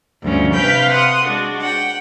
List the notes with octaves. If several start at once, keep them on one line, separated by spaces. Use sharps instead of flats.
D2 G2 F3 C#4
C3 B4 F5 G5 B5 G6
F#5 C6 D#6
G#3 D4 F#4
F#5 G5